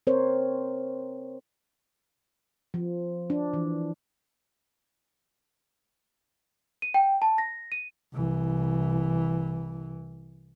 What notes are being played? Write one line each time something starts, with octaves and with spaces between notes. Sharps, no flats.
C4 A#4 C5 C#5
F3
D4
E3
D#7
G5
A5
A#6
D#7
C2 E3